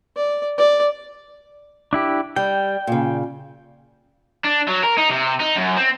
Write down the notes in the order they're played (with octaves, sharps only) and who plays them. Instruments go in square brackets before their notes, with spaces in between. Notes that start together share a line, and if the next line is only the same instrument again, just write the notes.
[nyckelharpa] D5
D5
[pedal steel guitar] D4 E4 G4
[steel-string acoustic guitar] G3 [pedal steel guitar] G5
[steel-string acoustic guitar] A#2 C#3
[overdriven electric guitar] D4
F#3
A#4
D#4
C3
D#4
F#2
C4